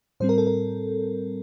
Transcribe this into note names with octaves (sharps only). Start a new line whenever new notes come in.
A2 G3 C4 C5
A#4
A4
A#4